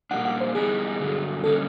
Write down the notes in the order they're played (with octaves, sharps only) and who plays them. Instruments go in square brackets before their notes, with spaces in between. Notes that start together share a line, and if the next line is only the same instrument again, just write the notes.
[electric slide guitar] A#2 G3 A#3 D4 [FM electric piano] F#5
[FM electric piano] F#5
C5
[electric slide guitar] E3 G3 B3 D#4 [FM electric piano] G#4
[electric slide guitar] G2 D3 F#3 A3
[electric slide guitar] D3 G3 A#3 C#4 [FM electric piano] A4